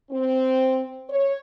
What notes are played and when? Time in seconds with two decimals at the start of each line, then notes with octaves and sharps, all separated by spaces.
0.11 C4
1.10 C#5